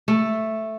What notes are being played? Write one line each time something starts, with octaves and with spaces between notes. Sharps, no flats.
A3